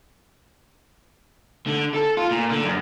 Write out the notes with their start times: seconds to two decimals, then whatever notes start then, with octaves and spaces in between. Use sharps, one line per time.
1.66 D3
1.94 A4
2.17 F4
2.31 A#2
2.50 D3
2.64 F#2